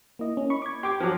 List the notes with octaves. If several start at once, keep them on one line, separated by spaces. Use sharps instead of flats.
A#3 E4 D#5
C#4
B5 C#6
D6 G#6
G4 C6 D6 G#6
F3 F#3